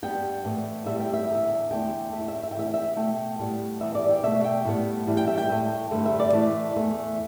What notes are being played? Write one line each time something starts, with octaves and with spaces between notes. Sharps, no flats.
G2 G3 B3 G5
A2 E3 B3
A2 G3 B3 E5
G5
E5
E2 D3 B3
E2 D3 A3 G5
A2 A3 E5 G5
E5
G5
E5
G5
A2 E3 B3 E5
G5
E5
B2 A3 G5
A2 G3 B3
E2 E3 G3 B3 E5
D5
G5
B2 A3 E5
G5
A2 G3 B3
A2 E3 G3
G5
E5
G5
A2 A3
G2 D3 A3
E5
D5
A2 E3 A3
E2 E3 A3